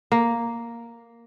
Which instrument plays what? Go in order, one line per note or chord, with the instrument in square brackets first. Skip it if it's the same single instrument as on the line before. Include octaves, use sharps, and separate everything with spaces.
[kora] A#3